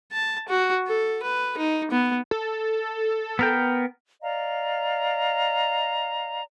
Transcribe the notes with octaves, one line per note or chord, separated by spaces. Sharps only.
A5
F#4
A4
B4
D#4
B3
A4
B3 A#4 G5
D5 D#5 F5 A#5